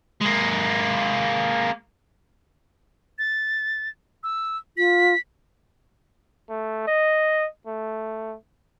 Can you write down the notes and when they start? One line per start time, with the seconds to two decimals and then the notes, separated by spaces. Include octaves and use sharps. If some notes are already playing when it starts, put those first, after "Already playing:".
0.21 G#3 A#3
3.19 A6
4.23 E6
4.77 F4 B6
6.49 A3
6.87 D#5
7.67 A3